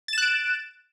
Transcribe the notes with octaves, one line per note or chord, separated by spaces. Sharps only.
F#6 A6 D7 E7